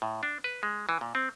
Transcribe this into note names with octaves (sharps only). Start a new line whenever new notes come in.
A2
D4
B4
G#3
E3
A#2
C4